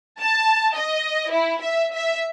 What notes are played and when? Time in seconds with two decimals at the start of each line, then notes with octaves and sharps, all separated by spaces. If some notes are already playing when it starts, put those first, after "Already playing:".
0.21 A5
0.76 D#5
1.31 E4
1.62 E5
1.94 E5